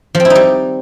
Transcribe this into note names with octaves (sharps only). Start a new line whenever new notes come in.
F3
C4
E4
D#4
G3